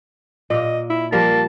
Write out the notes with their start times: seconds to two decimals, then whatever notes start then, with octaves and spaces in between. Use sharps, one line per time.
0.50 A#2 A#3 D#5
0.90 E4
1.12 F3 G3 A#3 A#4 A5